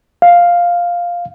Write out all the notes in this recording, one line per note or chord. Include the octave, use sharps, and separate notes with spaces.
F5